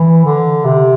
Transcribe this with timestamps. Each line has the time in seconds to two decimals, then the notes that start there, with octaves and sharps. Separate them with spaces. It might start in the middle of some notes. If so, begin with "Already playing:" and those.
Already playing: E3
0.25 D3
0.65 C3